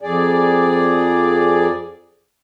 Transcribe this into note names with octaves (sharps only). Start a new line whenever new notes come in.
F2 G#4 D5